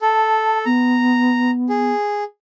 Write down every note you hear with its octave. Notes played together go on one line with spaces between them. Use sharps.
A4 A5
B3 A#5
G#4